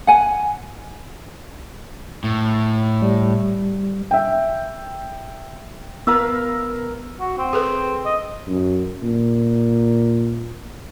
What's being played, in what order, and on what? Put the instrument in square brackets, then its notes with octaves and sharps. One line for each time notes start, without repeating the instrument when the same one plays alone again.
[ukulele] F#5 G#5
[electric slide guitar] A2
[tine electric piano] G3
[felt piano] E5 G5
[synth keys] B3 B4 [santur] A#4 F5 E6
[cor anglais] F#4
C4
[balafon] G#4 A4 B4
[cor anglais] D#5
[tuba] F#2
A#2